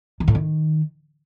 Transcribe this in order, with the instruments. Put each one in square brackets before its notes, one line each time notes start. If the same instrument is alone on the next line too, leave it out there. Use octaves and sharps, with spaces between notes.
[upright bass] D#3
A2
D#3